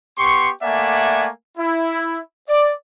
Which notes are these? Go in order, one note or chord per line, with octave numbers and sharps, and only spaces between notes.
B3 G4 C6 C#6
A3 A#3 D5 E5 F#5 G#5
E4
D5